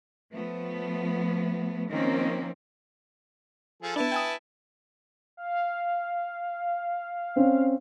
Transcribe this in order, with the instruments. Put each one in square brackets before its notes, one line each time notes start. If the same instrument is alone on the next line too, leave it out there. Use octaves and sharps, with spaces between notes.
[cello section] F3 A3 B3
D#3 F3 A#3 C4 C#4
[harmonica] F3 G#4 A4
[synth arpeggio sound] B3 D4 [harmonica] E4 B4 A5
[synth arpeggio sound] G5 G#5 D#6
[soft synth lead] F5
[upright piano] C4 C#4